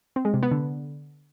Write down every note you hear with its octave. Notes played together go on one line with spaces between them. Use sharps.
C4
G#3
C3
B3
D3